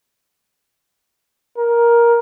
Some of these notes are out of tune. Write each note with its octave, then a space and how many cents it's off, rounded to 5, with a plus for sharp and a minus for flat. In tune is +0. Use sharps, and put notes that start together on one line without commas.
A#4 +10